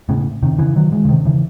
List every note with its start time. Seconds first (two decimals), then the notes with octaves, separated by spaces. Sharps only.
0.09 A2 C#3
0.43 C3 D#3
0.58 C#3 E3
0.76 D#3 F#3
0.92 E3 G#3
1.05 C#3
1.09 C3 D#3
1.25 C#3 E3